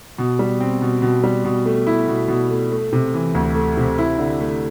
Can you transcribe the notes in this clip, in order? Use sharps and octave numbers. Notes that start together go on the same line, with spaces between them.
B2
G3
C4
B2
B2
G3
B2
A3
E4
B2
B2
A3
A3
C3
E3
D2
A3
C3
E4
D3
A3